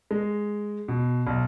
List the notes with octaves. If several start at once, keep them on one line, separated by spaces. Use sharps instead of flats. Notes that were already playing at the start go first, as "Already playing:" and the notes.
G#3
B2
B1